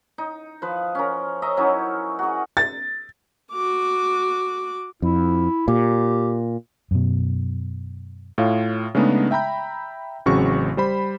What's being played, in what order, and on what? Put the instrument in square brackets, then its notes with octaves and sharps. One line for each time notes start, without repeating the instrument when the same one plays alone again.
[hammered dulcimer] D#4
F3 B4
C#4 A#4
C#5 D#5 E5 A#5
F#3 C#4 D#4 E4
F#4 G#4
[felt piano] A6
[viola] F#4 D6
[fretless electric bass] F2 [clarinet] E4
[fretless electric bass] A#2 [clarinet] G4
[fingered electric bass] F#2 B2
[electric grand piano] A2 F4 C#5 F5
C#3 G#3 A3 B3 D4 D#4
E5 G5 A#5 B5 G6
A1 C#3 F#3 C4 F#4 C#6
G3 C5 B5